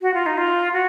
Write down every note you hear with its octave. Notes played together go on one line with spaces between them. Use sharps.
F#4
F4
D#4
F4
F#4